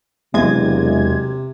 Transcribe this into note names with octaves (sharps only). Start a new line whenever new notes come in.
E1 E2 C3 F#3 G#3 E5 G#6